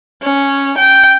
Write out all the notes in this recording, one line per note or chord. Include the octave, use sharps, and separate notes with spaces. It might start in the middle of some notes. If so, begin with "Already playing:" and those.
C#4
G5